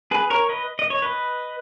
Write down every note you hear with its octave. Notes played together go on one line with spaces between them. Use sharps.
G#4 B4
A#4 C#5
B4 D#5
D#5
C#5
B4 D#5